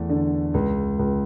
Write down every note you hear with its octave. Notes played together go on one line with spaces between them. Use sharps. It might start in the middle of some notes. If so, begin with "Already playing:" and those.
Already playing: E2 A3
D3
C#2
C#2